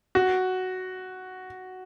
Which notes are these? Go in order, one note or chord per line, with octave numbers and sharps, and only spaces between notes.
F#4